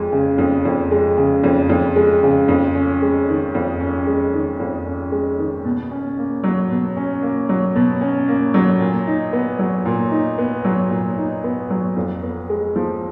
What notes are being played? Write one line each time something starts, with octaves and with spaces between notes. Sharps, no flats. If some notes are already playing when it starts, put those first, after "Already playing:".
Already playing: F2 G#3
C#3
F2
F2
G#3
C#3
F2
F2
G#3
C#3
F2
C#4
G#3
D#3
F2
C#4
G#3
D#3
F2
C#4
G#3
D#3
B2
C#4
A#3
F#3
B2
C#4
A#3
F#3
B2
C#4
A#3
F#3
A#2
D#4
B3
F#3
A#2
D#4
B3
F#3
A#2
D#4
B3
F#3
F2
B3
G#3
F3